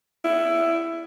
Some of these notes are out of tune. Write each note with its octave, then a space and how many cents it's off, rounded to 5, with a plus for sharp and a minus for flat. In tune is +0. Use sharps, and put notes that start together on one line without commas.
E4 +15